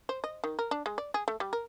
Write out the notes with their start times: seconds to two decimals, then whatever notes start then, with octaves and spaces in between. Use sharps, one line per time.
0.09 C5
0.24 D#5
0.44 D#3
0.59 A#4
0.71 D4
0.86 G#3
0.98 D5
1.14 G#4
1.28 A3
1.40 G3
1.53 A#4